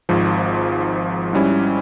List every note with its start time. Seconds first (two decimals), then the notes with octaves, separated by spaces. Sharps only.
0.09 G#1 G#2 F3
1.33 G#2 G3 C#4 E4